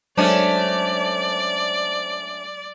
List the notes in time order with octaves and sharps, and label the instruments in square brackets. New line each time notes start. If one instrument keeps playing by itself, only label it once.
[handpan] F#3 G#3 [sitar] A3 C#4 D4 [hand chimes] C5 A5 [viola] D5